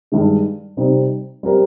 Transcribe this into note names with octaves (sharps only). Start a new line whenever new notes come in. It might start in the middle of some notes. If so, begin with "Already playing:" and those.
G2 D#3 G#3
C3 G3 C4 D#4
G3 C4 G4 A#4